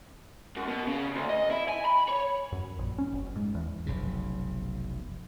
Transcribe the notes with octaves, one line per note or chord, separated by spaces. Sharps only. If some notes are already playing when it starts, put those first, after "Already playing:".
F#2
B2
C#3
D2
D#5
E4
G#5
B5
C#5
F#2
A#1
C#4
F#1
G#2
E2
F1 B1 F#2 C#3